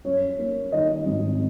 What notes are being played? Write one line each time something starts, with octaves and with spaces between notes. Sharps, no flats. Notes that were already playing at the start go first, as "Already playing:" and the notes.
F#2 C#5
A#3
D#3 D#5
G#1